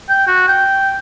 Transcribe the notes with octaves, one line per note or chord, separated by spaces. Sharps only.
G5
F#4
G5